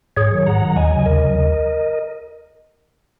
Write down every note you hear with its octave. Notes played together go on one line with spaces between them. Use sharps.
G#2 G#4 C#5
D#3 F#3
G#2 F#5 A#5
D#3 F#3
D#2 D#5 G#5
C#3 F#3
D#2 A#4 D#5
C#3 F#3
D#2